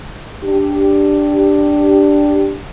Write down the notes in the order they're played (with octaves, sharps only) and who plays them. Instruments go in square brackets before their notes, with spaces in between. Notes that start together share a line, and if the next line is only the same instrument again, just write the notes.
[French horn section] D4 G4